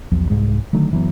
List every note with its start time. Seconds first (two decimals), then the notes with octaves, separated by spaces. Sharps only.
0.12 B1 E2 F3
0.30 C2 G#2 G#3
0.73 D3 D#3 F#3 A3
0.91 F#1 E3 F#3 B3